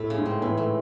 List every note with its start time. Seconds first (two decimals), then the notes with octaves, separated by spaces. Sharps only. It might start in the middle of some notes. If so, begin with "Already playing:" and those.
Already playing: A2 A3
0.10 C#3
0.18 G#2
0.26 C4
0.42 A2 E3
0.57 A3